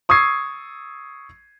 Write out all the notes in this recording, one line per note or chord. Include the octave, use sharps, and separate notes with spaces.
C#6 D#6 E6 G#6 C7